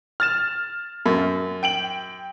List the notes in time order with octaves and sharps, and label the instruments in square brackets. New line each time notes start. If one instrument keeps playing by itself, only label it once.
[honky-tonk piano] F6 A6 E7
[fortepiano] F#2
[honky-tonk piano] G5 D7 F#7